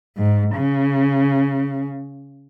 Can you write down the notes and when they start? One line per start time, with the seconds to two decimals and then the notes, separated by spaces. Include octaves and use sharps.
0.17 G#2
0.55 C#3